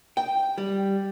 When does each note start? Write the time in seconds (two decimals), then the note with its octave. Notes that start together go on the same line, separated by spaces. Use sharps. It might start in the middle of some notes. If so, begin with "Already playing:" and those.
0.17 G5
0.58 G3